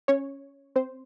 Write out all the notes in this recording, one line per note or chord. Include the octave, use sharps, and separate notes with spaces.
C#4 C#5
C4 C5